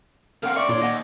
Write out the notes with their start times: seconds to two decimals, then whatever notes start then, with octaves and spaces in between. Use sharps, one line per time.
0.43 C#3 C4 A#4 F5 F#5
0.56 D5 E5 C#6
0.69 A#2 D4 E4 F4 C#5 C6
0.81 D#2 D#5 F#5